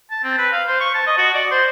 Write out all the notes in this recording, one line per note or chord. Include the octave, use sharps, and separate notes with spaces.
A5
C4
B4
F5
C5
C#6
A5
D#5
F#4
D5
C5